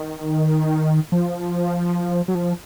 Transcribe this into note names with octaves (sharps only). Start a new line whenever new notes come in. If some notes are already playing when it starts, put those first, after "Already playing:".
Already playing: D#3
F3
F#3
F3